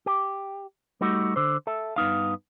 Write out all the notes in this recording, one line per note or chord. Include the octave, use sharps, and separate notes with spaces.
G4
G3 A3 D#4 F#4
D3 C5
A4 E5
G2 B3 D#4 F5